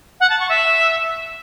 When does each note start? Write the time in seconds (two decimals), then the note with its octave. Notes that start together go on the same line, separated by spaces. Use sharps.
0.20 F#5
0.30 A5
0.39 C#6
0.49 E5